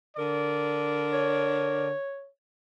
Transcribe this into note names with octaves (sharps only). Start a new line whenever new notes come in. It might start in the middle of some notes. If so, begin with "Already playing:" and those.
D3 A#4 D5
C#5